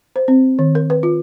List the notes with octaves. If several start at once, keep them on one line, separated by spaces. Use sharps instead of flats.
C5
C4
D#3
A#4
B4
F4